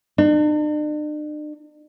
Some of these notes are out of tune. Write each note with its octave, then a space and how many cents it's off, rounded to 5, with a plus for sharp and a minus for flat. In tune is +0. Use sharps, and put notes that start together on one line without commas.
D4 +45